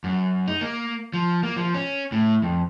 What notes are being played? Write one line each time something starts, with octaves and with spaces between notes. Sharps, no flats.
F#2
D#4
A#3
F3
A#3
F3
C#4
A2
F2